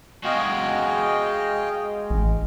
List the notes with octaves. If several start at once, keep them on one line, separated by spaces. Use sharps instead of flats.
G#3 F#4 D#5 F5 G5
A1